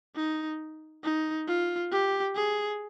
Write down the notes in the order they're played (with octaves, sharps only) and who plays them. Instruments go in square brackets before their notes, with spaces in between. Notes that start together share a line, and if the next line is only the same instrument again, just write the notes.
[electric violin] D#4
D#4
F4
G4
G#4